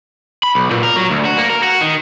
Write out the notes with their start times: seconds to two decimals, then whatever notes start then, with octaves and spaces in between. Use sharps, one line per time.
0.43 B5
0.55 B1
0.71 A#2
0.83 A#4
0.96 F#3
1.10 D2
1.25 F#4
1.37 A#3
1.50 A#4
1.63 F#4
1.81 D#3